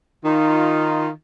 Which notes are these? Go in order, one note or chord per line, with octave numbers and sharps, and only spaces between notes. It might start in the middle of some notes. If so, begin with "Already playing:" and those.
D#3 D#4 F4